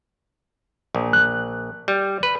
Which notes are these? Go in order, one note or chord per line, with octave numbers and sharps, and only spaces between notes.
A#1
F#6
G3
B4